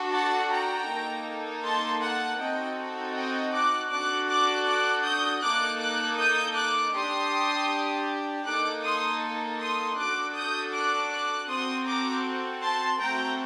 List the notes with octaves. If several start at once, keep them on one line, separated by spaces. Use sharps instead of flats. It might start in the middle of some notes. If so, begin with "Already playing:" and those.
Already playing: D4 F#4 A4
F#5 A5
G5 A#5
A#3 D#4 A4
A5 C6
F#5 A5
C4 D#4 F#4 A4 D#5 G5
D#5 G5
D6 F#6
D4 F#4 A4 D6 F#6
D6 F#6
D6 F#6
D#6 G6
A#3 D#4 A4 D6 F#6
D6 F#6
D#6 G6
D6 F#6
D4 G4 C6 D#6
A#3 D#4 A4 D6 F#6
C6 D#6
C6 D#6
D4 F#4 A4 D6 F#6
D#6 G6
D6 F#6
D6 F#6
C4 F#4 A4 C6 D#6
A#5 D6
A5 C6
A3 C4 F#4 A4 G5 A#5